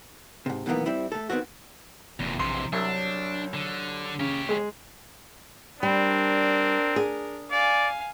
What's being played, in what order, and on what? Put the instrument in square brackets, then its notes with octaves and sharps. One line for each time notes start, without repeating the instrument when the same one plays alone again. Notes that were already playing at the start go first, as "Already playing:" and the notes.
[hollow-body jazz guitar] G#2 C3
B1 B2 D#3 E3 A#3 B3
G3 C4 E4
A3 A4
D#3 F3 B3 C4 F#4
[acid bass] F1 [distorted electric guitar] E2 A#2
[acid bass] A#1 [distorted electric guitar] C3 E3 [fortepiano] C6
[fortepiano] C2 E5 [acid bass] F#3 [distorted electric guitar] D4
[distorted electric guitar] D3
[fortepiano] C#3 [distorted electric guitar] G4 C#5
[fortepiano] G#3 G#4
[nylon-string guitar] G3 [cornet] C4 [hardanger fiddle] D4 A#4
[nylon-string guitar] G#4
[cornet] D5 [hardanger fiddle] F5 G#5